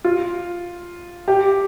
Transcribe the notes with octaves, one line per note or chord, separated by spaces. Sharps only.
F4
G4